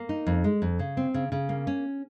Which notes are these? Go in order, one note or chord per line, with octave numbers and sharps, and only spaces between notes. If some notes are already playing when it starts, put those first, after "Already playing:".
Already playing: A#3
D#4
F2
G#3
F2
C#3
C4
C#3
C#3
A#3
C#4